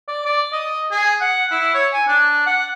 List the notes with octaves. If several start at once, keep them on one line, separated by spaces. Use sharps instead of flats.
D5
D5
D#5
G#4
F#5
E4
C#5
G#5
D4
F#5